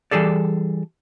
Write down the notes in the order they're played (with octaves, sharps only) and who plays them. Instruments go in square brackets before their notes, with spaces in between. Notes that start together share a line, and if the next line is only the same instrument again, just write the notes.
[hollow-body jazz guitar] E3 G3 G#4 A4 D5